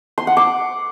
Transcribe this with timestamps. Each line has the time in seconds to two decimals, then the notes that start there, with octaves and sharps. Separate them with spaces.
0.18 C6
0.27 F#5
0.37 D6